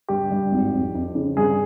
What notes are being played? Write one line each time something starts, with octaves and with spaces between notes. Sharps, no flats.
G2 G4
G2
G#1
F2
F2
C#3
G2 G#4